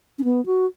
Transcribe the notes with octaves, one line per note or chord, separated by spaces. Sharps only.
C#4
B3
F#4